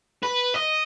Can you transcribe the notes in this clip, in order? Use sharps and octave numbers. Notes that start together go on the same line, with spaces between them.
B4
D#5